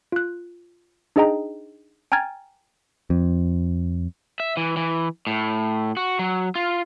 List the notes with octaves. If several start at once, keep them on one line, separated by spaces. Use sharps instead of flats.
F4 F#6
D4 D#4 G#4 D#5 G5 A#5
G5 G#5 A#5 F6 G#6 A6
F2
E5
E3
E3
A2
F#4
F#3
F4